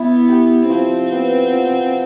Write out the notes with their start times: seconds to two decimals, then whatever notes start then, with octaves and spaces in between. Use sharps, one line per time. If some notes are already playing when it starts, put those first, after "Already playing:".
Already playing: B3 E4
0.29 G4
0.70 F3 C4
1.12 B3
1.53 F3